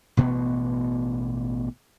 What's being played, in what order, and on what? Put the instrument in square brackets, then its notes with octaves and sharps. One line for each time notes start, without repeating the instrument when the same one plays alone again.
[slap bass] A1 B2 B3